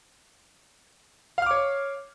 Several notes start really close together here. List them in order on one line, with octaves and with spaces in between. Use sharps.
F5 F6 D6 C#5